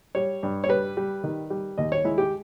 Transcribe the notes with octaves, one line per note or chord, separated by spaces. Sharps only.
G3 C#5
G2
C#5
G3 B4
G3
D#3
G3
D#2 D#5
C#5
G#3 E4
G4